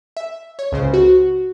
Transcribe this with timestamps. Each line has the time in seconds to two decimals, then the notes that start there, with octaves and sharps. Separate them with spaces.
0.17 E5
0.59 C#5
0.72 C#2 C#3 C5
0.94 F#4